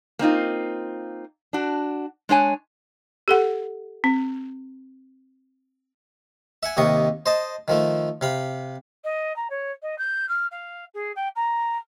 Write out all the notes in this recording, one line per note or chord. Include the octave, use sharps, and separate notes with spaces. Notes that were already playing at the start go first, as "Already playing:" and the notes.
A#3 C4 D#4 F4
D4 F#4
G#3 D4 C#5 G#5
G4 A4 F#5
C4
E5 F#5 G#5
D#2 C3 D#3 D#5 C#6
C5 D#5 A5
D#3 F3 A3
C3 F5 B5
D#5
A#5
C#5
D#5
G6
F6
F5
G#4
G5
A#5